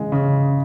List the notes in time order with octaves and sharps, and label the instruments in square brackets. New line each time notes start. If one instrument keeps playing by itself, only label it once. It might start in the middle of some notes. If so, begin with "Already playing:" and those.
Already playing: [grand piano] C#3 E3 G#3
C#3